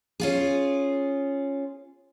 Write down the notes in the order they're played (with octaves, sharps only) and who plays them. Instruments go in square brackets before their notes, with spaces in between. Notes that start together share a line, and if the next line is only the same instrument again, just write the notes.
[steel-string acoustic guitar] C#4 F4 G#4